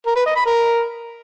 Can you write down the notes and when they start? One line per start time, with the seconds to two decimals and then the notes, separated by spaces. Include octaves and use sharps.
0.06 A#4
0.16 B4
0.26 D#5
0.36 B5
0.46 A#4